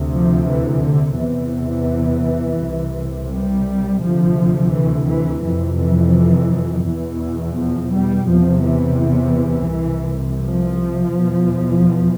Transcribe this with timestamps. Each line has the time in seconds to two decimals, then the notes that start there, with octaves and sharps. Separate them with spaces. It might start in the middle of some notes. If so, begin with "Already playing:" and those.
Already playing: D2 C3
0.12 F3
0.47 E3
0.82 D3
1.17 E2 C3 E3
2.59 C3
2.65 C2
3.32 G3
4.03 D2 C3 F3
4.72 E3
5.08 E3
5.44 F2 C3 E3
5.79 E3
6.86 E2 B2 E3
7.58 F3
7.93 G3
8.28 E2 C3 F3
8.63 E3
8.99 E3
9.71 C2 C3
10.42 F3
11.13 E2 B2